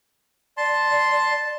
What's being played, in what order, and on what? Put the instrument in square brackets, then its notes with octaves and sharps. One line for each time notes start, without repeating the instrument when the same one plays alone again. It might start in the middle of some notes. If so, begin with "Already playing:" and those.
[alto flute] D5 [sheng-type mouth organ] A5 C6